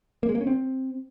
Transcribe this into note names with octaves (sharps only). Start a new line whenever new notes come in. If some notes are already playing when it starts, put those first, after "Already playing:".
A#3
G#3
A#3
C#4
C4